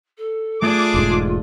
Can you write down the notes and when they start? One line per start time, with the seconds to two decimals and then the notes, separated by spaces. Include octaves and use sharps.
0.17 A4
0.62 A3 D4 F4 G#4 A4 D5 D6
0.94 E1 G#2